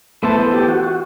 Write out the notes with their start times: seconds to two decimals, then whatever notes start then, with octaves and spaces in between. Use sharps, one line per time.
0.23 E3 A3 B3 E4 A4 C5
0.54 G4
0.68 F#4
0.84 F#4